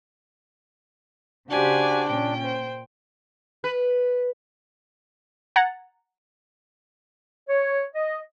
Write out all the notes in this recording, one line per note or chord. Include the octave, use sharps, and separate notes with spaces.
C#3 D4 F#4 G4 C5 D5 G#5
A#2 C#4 G5
C5
B4
F#5 A#5 G#6 A6
C#5
D#5